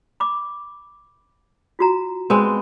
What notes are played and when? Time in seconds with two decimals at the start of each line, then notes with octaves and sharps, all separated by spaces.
0.20 B5 D6
1.79 F4 F#4 A#5
2.30 G#3 B3 C4